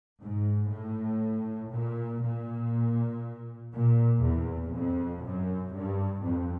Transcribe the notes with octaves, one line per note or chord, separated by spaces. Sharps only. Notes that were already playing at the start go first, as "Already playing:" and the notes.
G#2
A2
A#2
A#2
A#2
E2
F2
F#2
G2
F2